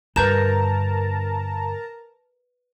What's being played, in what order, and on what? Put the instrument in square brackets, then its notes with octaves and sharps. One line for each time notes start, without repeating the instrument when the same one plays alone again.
[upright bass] G2 D3 [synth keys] A#4 A5 A#5 [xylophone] B4 G6 E7